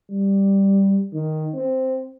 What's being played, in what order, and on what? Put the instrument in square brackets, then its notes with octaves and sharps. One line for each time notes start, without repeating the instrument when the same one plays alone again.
[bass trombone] G3
D#3
C4